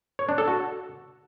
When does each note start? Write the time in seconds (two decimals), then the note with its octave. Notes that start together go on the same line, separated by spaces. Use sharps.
0.19 C#5
0.29 D4
0.38 A4
0.48 F#4